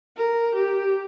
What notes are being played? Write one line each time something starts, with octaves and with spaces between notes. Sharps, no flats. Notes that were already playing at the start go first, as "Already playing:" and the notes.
A#4
G4